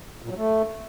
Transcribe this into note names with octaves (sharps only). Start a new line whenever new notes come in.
A#2
F#3
A3